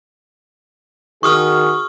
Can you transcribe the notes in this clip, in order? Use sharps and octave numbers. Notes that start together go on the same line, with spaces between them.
D#3 F#4 G#4 C#6 D#6 F6